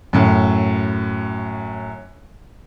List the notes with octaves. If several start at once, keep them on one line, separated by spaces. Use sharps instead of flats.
F#2 A2